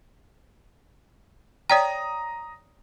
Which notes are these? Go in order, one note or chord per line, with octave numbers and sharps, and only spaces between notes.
C#5 D5 G5 A#5 D#6